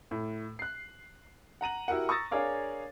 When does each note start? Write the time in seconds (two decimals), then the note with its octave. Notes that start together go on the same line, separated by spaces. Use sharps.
0.11 A2
0.59 F#6 C7
1.61 F#5 A#5 D#7 F#7
1.88 E4 F#4 G4 A#4 F#5
2.08 A#5 C#6 D#6 E6 A6 A#6
2.31 D4 G#4 A#4 C#5 F5 D6